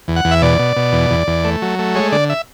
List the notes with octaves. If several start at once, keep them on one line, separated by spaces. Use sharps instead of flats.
E2
F#5
E2
E5
B2 D5
B2
B2
E2
E2
E2
A3
F#3
A3
G#3 C#5
D3 D5
E5